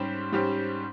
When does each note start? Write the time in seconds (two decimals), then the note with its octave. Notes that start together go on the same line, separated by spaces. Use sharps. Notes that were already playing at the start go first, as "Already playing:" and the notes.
Already playing: G#2 G3 C#4 G4 C5
0.32 G#2 G3 C#4 G4 C5